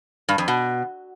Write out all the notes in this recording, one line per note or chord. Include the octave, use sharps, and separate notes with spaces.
G2
F2
B2